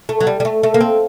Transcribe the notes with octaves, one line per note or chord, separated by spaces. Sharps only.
A3
F#3
G3
G3
A3
A3
A#3
C4